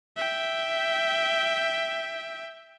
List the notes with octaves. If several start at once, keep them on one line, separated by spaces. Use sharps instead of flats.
E5 G5